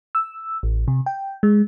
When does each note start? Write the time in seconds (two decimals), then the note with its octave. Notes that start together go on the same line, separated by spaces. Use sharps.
0.15 E6
0.63 A1
0.88 C3
1.06 G5
1.43 G#3